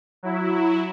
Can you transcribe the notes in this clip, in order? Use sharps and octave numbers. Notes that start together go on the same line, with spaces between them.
F#3 E4